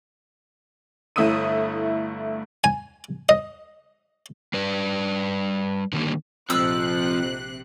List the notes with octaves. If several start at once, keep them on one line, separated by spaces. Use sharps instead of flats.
G1 A3 E4 D#6 E6 D#7
G#5
D#5
G3 B4 D5
D3 D#3 G3 A#3
A#1 F2 C3 F3 E6 F#6